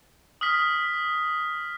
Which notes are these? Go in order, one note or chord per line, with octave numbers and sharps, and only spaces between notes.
D#6 F6 B6